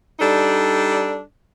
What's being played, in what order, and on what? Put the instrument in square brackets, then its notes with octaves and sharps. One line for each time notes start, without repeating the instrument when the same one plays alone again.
[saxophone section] G3 D4 D#4 A4